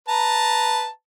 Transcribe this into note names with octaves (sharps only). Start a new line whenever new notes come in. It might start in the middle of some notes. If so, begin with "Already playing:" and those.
B4 A5 A#5